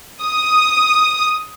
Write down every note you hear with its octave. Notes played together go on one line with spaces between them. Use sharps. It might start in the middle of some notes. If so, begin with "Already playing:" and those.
D#6